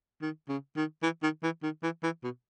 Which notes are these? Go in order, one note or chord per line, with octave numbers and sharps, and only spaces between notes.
D#3
C#3
D#3
E3
D#3
E3
D#3
E3
E3
B2